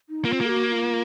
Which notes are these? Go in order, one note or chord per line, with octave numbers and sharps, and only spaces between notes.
D#4
A#3 F4
C4
A#3 A4
F#4
F#4
F4